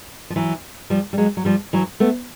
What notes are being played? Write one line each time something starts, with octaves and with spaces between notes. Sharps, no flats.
F3
E3 F#3
F3 G3
G3
F#3 G#3
F#3
F3 G3
E3 F#3
A3 B3